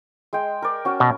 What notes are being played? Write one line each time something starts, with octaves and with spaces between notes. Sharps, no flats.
G#3 G5
A#4 D5
C#4 F#4
B2